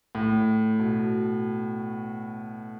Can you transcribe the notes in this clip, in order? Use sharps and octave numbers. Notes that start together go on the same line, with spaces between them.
A2
B2